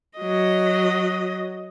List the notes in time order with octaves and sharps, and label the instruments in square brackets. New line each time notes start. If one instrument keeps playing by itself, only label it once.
[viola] F#3 D#5